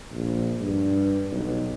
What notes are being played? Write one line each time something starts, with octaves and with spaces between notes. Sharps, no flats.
A#1
G2
B1